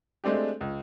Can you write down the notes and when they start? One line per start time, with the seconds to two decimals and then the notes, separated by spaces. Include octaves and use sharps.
0.24 G#3 A3 C4 D4 G4
0.61 C#2